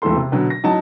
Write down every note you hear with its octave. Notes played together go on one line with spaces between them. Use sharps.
E1 A1 A2 A4 C6
C3
B2 D3 F#3
A#6
A2 F#3 D#4 A5